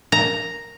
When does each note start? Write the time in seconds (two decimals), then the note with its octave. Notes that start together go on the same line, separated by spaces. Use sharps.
0.12 A#5